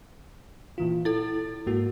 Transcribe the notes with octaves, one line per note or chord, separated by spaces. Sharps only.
A#2 E3 F4
E4 A4 A6
G#2 A#3 F#4